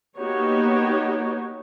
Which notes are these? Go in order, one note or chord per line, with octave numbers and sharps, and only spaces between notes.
A#3 B3 D#4 F#4 G4 C#5